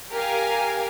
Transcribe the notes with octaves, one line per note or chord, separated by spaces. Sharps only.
G4 A#4 F5 G#5